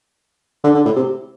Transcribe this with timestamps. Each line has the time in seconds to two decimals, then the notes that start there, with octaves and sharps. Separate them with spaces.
0.64 D3
0.74 D3
0.86 A2
0.96 C3